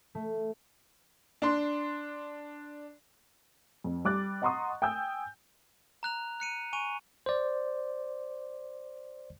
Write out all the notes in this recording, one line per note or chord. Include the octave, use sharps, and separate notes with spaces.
A3
D4 C6
F2
G3 D6 F#6 A6
D#5 F#5 A#5 C6 C#6 D#6
G5 G#5 D#6 E6 G6
A#5 F#6 F7
F#6 C#7 D#7
G#5 C#6 D#7 F7
C5 D5